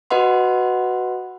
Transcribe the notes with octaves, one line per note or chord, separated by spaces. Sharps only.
F#4 B4 D#5 F#5 C6